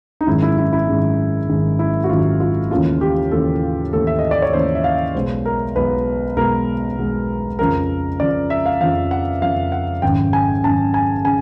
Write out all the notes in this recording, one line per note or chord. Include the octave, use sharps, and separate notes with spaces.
D#4
G#1 F#2 D#3 G#3 E4
E4
E4
E4
G#1 F#2 D#3 G#3
G#1 F#2 D#3 G#3
E4
F#4
G#1 F#2 D#3 G#3 F4
F4
D#2 C#3 E3 A3 F4
G4
D#2 C#3 E3 A3 A4
D#2 C#3 E3 A3 A4
E5
D#5
D5
C#5
D#2 C#3 E3 A3 C5
E5
F5
B1 B2 G#3 B3 C5
A#4
B1 B2 G#3 B3 B4
B1 B2 G#3 B3 A#4
B1 B2 G#3 B3
F2 C#3 F3 A#4
F2 C#3 F3 D5
E5
F5
F2 C#3 F3 F5
F#5
F2 C#3 F3 F5
F#5
G#1 F#2 C#3 G5
G#5
G#1 F#2 C#3 A5
G#5
C#3 G#5